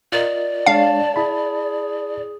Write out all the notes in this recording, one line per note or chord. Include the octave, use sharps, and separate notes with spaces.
F4 A#4 D5 D#5
G#3 D4 C#5 F5 A5
E4 G#4 A5 B5